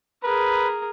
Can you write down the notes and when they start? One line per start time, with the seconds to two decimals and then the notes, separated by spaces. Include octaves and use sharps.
0.23 G#4 A#4 B4